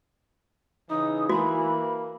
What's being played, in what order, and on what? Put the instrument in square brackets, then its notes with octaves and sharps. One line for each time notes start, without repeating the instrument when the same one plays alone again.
[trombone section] C#3 E3 [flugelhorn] D#4 [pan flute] D#6
[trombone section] E3 [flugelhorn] A#3 [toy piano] F#4 [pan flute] B5